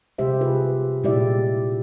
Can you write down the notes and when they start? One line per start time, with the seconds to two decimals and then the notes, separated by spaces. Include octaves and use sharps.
0.18 C3 G#3 G4 C5 E5
0.41 F4 G#4 B4
1.04 A#2 G#3 E4 G4 D5 E5